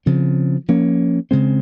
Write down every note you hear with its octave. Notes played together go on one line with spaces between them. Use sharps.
C#3 F3 C4
F3 A#3 C#4
C#3 G#3 C4